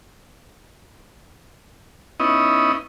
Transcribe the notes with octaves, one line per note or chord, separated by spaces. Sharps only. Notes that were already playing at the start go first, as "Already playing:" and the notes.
B3 C#4 D#4 E4 D#5